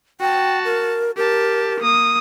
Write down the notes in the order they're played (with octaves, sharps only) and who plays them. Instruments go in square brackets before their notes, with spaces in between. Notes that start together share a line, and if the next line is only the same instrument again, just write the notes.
[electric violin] F#4 A5 [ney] G5
[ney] A#4
[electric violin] G4 A5 [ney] A#4
[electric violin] A#3 D#6